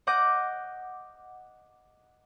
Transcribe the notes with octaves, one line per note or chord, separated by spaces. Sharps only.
D#5 F#5 D6 G6 A#6